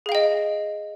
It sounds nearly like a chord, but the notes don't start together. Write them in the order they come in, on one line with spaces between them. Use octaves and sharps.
G#4 F5 G5 D#5